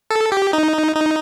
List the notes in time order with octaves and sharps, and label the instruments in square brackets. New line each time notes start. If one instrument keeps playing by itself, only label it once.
[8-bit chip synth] A4
G4
D#4
D#4